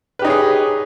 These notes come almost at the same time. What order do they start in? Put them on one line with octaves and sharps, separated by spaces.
B4 G4 D#4 C#5 G#4